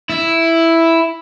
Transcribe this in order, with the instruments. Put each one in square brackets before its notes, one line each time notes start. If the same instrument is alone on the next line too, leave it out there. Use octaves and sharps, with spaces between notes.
[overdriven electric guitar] E4